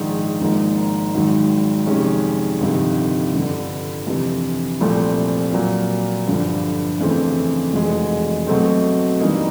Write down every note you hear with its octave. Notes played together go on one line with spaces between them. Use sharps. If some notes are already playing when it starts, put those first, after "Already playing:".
Already playing: A#1 G#2 D#3
G#1 G#2 F3 A#3 D#4
G#1 G#2 D#3 F#3
F2 C3 D#3 G#3 C#4
G1 F2 C3 D#3
G1 G2 D3
F2 C3 E3
C2 A#2 F3 A3 C4
A#2 F#3 A#3
G1 G2 D3 F3
F2 C#3 E3 A3 C4
F1 E2 B2 G#3
B2 F#3 A3 C4
G2 E3 G3 A#3 D#4